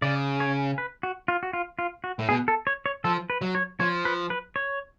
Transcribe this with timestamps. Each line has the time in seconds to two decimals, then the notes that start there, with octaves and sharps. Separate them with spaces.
0.02 C#3 D5
0.40 C#5
0.78 B4
1.03 F#4
1.28 F4
1.43 F#4
1.53 F4
1.79 F4
2.04 F#4
2.19 A2
2.29 B2 G#4
2.48 A4
2.67 C#5
2.86 C#5
3.04 F3 A4
3.30 B4
3.42 F#3
3.55 C#5
3.80 F3 C#5
4.05 B4
4.30 B4
4.56 C#5